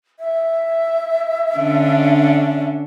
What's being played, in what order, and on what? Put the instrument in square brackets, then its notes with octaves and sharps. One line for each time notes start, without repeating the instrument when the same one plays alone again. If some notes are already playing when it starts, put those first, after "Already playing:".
[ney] E5
[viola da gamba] D3 C#4 D4